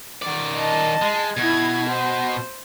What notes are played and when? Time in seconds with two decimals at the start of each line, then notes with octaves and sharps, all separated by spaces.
0.22 D#3 D5
0.56 D#5 A5
1.02 G#3
1.37 B2 E4 G#6
1.90 C5